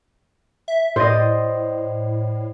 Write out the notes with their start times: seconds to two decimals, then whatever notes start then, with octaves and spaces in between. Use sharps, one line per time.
0.68 E5
0.96 A2 C5 D5 D#5